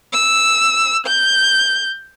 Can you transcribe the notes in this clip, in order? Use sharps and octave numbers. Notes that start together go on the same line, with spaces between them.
E6
G6